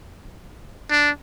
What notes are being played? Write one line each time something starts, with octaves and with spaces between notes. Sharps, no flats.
D4